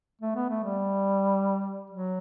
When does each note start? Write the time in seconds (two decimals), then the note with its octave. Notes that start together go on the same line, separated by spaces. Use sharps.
0.21 A3
0.35 B3
0.50 A3
0.63 G3
1.90 F#3